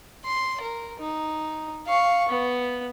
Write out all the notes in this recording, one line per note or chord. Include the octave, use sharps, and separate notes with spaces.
C6
A#4
D#4
F5 C#6
B3